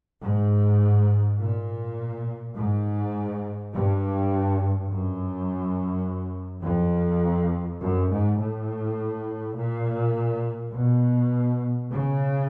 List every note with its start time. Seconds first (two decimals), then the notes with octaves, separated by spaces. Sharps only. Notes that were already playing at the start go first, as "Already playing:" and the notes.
0.22 G#2
1.39 A#2
2.55 G#2
3.72 G2
4.89 F#2
6.63 F2
7.80 F#2
8.10 G#2
8.39 A2
9.56 A#2
10.72 B2
11.90 C#3